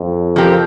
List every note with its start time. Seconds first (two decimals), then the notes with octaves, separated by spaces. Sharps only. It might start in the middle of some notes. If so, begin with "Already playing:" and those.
Already playing: F2
0.36 F3 C4 G4 A#4